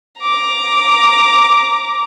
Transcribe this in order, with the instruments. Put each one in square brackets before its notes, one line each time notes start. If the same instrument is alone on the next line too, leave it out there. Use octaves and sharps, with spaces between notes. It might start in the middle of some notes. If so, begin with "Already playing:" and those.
[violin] A#5 D6